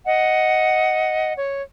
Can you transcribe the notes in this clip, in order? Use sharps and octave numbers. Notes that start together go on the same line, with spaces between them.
D#5 F#5
C#5